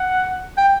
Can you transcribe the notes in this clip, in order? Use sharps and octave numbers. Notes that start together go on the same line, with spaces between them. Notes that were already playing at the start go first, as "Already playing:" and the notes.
Already playing: F#5
G5